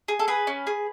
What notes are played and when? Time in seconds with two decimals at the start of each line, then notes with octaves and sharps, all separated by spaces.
0.08 G#4
0.19 A4
0.28 G#4 B4
0.47 C#4
0.67 G#4